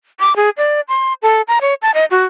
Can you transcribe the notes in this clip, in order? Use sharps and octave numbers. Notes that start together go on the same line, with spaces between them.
D6
G#4
D5
C6
A4
A#5
C#5
A5
D#5
F#4